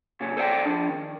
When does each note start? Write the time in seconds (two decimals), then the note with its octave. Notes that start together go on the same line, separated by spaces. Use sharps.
0.20 C#2 A#2 C#4
0.37 A4 C5 D5 E5 G5
0.65 F3 D4
0.90 D#3